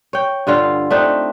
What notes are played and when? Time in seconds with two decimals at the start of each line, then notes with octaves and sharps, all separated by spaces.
0.13 C#5 G5
0.47 G2 D3 F4 F5
0.91 A3 C4 D4 D#4